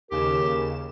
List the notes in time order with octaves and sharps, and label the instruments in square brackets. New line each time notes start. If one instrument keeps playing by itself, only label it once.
[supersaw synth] D#2 C#3 E7 [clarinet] G4 [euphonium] A#4